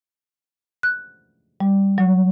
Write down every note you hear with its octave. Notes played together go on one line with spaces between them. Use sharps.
F#6
G3
F#3